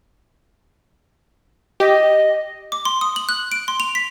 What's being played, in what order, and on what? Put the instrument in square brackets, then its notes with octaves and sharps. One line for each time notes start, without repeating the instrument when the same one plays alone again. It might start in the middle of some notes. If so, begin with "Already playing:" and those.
[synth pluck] G4 [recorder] D#5
[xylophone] D6
C6
D#6
F#7
F#6
D7
C6
F7
B6